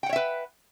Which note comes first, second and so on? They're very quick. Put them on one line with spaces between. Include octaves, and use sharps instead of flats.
G5 F#5 C#5 E5 B4